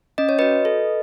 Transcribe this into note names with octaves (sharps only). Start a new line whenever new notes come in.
C#4 D#5
C#5
F#4 B4 D#5
A4